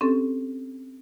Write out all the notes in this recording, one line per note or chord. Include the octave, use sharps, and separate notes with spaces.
C4 C#4 G4 A4